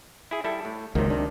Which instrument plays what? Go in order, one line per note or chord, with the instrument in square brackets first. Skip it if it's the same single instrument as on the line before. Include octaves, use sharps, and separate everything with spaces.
[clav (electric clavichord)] E4 G#4
G3 E4 A4
A2
[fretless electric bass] C#2 F#3 [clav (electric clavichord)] C3 A#3 [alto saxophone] D#3
[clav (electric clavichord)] C3 [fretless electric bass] D4